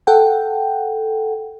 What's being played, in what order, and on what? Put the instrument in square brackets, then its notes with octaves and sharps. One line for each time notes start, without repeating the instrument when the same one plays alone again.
[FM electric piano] A4 F#5 G5